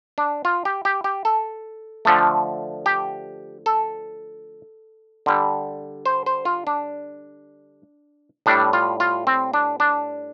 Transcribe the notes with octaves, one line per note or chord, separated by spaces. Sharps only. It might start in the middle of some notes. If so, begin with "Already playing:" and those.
D4
F4
G4
G4
G4
A4
D3 F3 A3
G4
A4
D3 G3
C5
C5
F4
D4
A2 G3 D4
F4
F4
C4
D4
D4